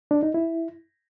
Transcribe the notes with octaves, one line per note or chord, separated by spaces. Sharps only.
D4
D#4
E4